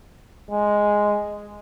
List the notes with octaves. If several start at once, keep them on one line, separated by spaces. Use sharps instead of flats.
G#3